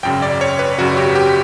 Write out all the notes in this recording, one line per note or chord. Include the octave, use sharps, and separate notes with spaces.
G#1 F#2 C#3 G5
D5
C#5
B4
G#1 F#2 C#3 F#4
G4
G4